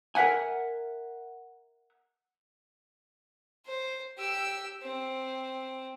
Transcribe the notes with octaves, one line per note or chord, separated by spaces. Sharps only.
A#4 C5 E5 F#5 G#5
C5
G4 E6
C4